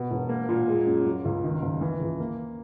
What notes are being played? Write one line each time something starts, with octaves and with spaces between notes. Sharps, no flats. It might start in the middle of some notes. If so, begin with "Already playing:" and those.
Already playing: B2
E1
A#3
A#2
G#3
F#2
F#3
C#2
D#3
F#1
E3
C#2
A#3